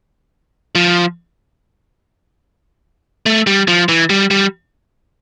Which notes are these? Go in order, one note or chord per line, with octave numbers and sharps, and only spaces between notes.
F3
A3
G3
F3
E3
G3
G3